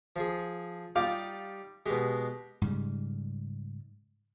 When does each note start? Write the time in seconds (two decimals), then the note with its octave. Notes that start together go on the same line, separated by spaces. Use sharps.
0.16 F3 F4 G#4
0.95 G3 D#4 F4 G4 F5 D6
1.86 B2 G#3 G4
2.62 G#2 C#3 G3